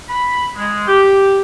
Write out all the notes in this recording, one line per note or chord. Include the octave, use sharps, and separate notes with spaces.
B5
G#3
G4